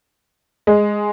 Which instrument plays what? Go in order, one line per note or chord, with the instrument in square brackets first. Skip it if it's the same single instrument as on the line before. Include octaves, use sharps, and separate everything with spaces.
[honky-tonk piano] G#3